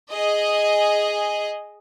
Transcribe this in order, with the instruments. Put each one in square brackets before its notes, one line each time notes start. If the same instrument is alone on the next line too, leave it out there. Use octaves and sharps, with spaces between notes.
[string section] G#4 D#5